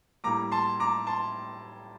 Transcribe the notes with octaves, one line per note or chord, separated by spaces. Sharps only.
A2 G3 A#3 A#5 D6
A5 C6
A#5 D6
A5 C6